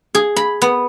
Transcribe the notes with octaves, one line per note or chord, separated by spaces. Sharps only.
G#4
B5
B3